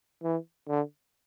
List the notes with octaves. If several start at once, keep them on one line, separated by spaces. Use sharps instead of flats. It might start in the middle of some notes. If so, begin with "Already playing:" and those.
E3
D3